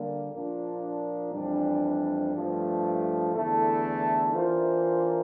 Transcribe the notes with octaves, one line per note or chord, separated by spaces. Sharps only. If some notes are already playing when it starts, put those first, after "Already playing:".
Already playing: D3 G3 A#3
A#2 F3 A#3 D4 F4
F2 E3 G3 D4
G2 F3 A3
E2 D3 A3 E4 A4
E3 A#3 D4 F4 C5